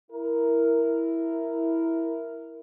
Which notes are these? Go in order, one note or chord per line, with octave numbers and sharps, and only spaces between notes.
E4 A#4